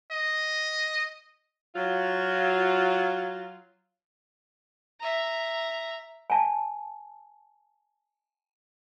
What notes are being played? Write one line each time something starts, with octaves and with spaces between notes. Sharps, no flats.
D#5
F#3 F4
E5 A#5
G#5 A5